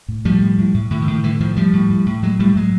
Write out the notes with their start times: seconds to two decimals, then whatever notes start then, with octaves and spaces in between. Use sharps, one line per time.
0.08 A2
0.25 A2 F3 G3
0.42 A2
0.58 A2
0.74 A2
0.90 A2 D3
1.02 D#3
1.07 A2
1.13 D#3
1.23 A2 D3 E3
1.40 A2 D#3 F3
1.56 A2 F3 G3
1.73 A2
1.90 A2
2.06 A2
2.23 A2 F#3 G#3
2.39 A2 G3 A3
2.56 A2 F#3 G#3